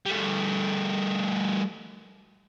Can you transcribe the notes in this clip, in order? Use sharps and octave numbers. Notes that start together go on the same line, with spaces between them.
G3 A3